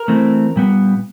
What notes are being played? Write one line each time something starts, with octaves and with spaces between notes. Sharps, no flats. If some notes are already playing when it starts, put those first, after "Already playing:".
Already playing: A#4
E3 A3 C4
A#2 G3 B3